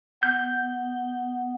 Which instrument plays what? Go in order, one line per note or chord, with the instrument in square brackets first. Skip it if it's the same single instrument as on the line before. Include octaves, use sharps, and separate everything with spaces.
[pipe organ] B3 [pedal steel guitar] G6